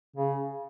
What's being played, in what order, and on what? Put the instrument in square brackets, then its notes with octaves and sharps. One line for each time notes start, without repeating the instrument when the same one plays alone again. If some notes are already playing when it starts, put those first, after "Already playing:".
[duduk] C#3